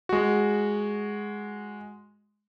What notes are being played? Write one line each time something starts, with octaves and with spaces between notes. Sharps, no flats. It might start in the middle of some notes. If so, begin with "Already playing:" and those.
G#3 F#4